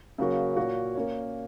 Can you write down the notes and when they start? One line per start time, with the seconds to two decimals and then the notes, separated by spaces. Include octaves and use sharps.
0.18 C#3 F#3 A#3 F#4 C#5
0.56 A#2 A#3 F#4 C#5
0.95 A#3 C#4 A#4 C#5